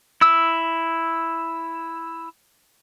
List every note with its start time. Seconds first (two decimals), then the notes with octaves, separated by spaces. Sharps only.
0.21 E4 E6